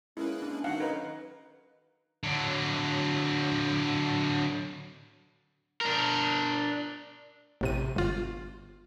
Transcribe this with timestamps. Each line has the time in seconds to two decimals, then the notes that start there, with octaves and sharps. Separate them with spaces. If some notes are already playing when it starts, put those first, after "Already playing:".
0.17 G#3 A#3 C#4 E4 B4
0.42 D4
0.64 D#3 F#3 D#4 F5 F#5
0.80 A#4 B4 D#5
2.24 D3 F#3
5.81 D4 A#4
7.61 A1 C3 D#7
7.96 G1 F4